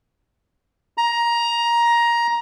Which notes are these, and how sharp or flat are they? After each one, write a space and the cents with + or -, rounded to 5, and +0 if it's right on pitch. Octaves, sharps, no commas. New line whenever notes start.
A#5 +15